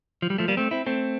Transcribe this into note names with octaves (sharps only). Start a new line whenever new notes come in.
F3
G3
F3 A3
G3 A#3
A3 C4
C4 E4
A3 C4